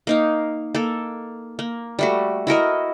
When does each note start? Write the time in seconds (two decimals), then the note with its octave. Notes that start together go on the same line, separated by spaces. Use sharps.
0.07 A#3 D#4 F5
0.75 A#3 A4
1.59 A#3
1.99 G3 A3 F#4
2.47 E4 F#4 A#4 D#5